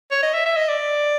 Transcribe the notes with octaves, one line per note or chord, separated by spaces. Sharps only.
C#5
D#5
E5
E5
D#5
D5